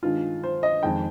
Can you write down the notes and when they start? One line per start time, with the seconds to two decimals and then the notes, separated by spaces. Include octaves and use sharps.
0.03 G2 D#3 G#3 F4
0.44 C5
0.63 D#5
0.83 F2 D#3 G#3 G5